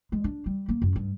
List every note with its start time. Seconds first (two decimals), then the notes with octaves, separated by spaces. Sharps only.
0.12 G#3
0.24 D4
0.46 G3
0.68 A#3
0.82 F#2
0.96 G2